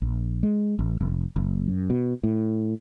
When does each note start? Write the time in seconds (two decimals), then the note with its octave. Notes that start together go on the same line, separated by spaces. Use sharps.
0.02 A#1
0.43 G#3
0.79 A1
1.01 F1
1.36 F#1
1.68 F#2
1.90 B2
2.23 A2